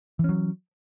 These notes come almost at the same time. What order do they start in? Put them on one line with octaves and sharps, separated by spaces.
E3 C#4 F#3